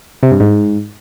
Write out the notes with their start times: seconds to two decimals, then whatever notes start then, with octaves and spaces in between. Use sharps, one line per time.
0.23 C3
0.31 G2
0.40 G#2